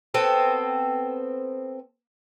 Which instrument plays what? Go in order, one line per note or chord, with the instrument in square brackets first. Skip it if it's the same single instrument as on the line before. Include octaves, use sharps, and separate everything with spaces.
[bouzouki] B3 C4 A4